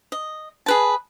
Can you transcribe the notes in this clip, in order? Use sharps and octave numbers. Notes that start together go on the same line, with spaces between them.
D#5
G#4 B4 A5